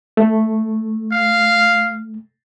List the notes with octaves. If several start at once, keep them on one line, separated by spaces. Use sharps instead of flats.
A3
F5